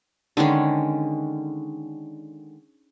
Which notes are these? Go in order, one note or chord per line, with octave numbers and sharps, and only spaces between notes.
D3 D#3 G#3 C#4